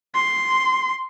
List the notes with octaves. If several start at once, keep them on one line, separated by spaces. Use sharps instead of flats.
C6